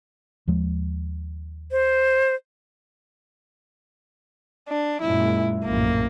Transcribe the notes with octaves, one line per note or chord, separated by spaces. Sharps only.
D#2 F3 G#3
C5
D4
F#2 A#2 G#3 E4
A#1 F#2 A2 A#3